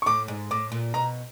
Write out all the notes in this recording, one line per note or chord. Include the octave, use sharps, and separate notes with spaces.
C#6
A2 D6
G#2
A2 D6
A#2
B2 A#5